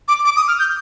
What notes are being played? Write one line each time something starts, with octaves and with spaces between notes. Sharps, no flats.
D6
D6
D#6
F6
G6